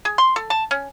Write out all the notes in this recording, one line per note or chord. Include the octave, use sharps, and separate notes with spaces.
G#4
C6
A4
A5
C#4